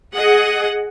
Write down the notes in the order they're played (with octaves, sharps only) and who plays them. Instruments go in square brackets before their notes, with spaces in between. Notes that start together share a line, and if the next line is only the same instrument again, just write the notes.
[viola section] G#4 D#5 F#5